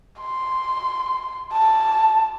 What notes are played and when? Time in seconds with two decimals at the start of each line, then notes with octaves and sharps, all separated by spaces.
0.20 C6
1.53 A5